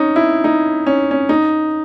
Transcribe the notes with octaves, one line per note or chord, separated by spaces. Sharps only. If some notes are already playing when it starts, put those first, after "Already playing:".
Already playing: C#4 D#4
E4
D#4
C#4
C#4
D#4